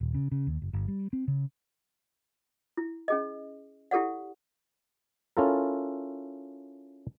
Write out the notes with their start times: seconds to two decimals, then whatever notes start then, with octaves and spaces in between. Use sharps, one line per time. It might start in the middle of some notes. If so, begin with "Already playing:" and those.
0.01 D#1
0.14 C#3
0.32 C#3
0.47 D#2
0.62 F#1
0.73 G1
0.88 G3
1.13 C4
1.28 C#3
2.77 E4
3.08 C#4 G#4 D#5
3.91 E4 G4 A4 D5 F#5
5.37 C#4 E4 F4 A4 A#4